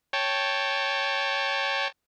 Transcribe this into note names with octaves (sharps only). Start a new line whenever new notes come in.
C#5 G5 A5